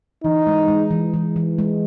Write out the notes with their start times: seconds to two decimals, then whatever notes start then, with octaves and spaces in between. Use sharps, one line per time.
0.23 E3 D#4
0.47 G#3
0.68 G#3
0.91 E3
1.14 E3
1.36 E3
1.58 G#3